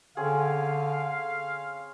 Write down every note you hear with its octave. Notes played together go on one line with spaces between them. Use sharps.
D3 C4 C#4 G#4 F5